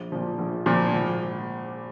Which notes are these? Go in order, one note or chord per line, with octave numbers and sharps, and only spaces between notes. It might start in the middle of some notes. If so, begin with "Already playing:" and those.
Already playing: A#1
A#2 F3
A#1
A#2 F3
G#1